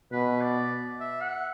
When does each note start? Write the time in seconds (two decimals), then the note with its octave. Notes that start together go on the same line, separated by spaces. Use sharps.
0.12 B2 B4
0.41 D5
1.00 E5
1.21 F#5